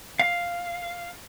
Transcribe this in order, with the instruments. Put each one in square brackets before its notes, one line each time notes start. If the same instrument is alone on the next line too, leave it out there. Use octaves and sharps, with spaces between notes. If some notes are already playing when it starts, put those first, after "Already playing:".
[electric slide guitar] F5